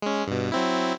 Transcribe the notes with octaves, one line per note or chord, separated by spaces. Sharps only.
G#3 C#4
G2 B2
F#3 C4 E4